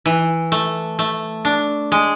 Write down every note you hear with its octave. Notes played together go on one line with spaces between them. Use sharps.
E3
A3
A3
D4
G#3